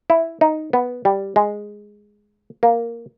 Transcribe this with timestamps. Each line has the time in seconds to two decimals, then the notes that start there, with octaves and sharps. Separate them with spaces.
0.10 E4
0.41 D#4
0.73 B3
1.05 G3
1.36 G#3
2.63 A#3